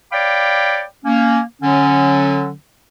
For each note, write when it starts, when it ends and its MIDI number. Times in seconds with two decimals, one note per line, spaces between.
0.12 0.83 73
0.12 0.83 74
0.12 0.83 77
0.12 0.83 79
0.12 0.83 83
0.12 0.83 86
1.05 1.40 58
1.05 1.40 61
1.62 2.51 50
1.62 2.51 54
1.62 2.51 61